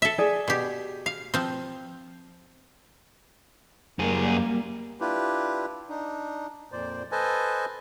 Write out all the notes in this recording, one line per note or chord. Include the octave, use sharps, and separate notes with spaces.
A4 E5
G#4 D5
B2 G4
F5
F3 C4
F#2 G3 A#3 G#4
D4 E4 F4 G4 B4
D4 D#4
F2 A#2 C5 D5
A4 B4 C5 D#5 G#5 A5